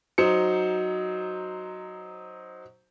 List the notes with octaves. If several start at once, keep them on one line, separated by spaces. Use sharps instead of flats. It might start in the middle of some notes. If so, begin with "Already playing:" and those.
F#3 D#4 C5 C#7